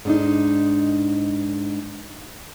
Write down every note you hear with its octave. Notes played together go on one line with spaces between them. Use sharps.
G#2 D4 D#4